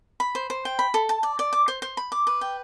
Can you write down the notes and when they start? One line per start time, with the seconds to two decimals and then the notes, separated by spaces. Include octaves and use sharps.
0.20 B5
0.35 C5
0.50 C5
0.65 G5
0.79 B5
0.94 A4
1.09 A5
1.23 D5
1.39 D5
1.53 D6
1.68 C5
1.82 C5
1.97 B5
2.12 D6
2.27 B4
2.41 G5